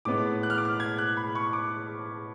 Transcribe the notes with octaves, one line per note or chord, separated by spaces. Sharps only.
A2 G#3 B3 D6
F#6
F6
D6
F6
G#6
F#6
B5
C#6
D6